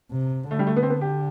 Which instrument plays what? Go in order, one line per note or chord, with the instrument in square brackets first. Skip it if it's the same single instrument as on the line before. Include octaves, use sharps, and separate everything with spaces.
[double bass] C3
[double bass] D3 [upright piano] A3
[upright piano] G3
A3
B3
C4
B3
G4